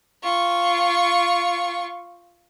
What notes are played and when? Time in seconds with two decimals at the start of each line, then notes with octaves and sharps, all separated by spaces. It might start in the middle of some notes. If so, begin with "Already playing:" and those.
0.23 F4 C#6